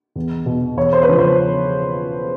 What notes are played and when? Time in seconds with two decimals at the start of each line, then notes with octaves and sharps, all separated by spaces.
0.16 E2
0.46 B2
0.77 E2 C#5
0.93 C5
1.03 B4
1.08 C#3 F3 C5
1.18 C5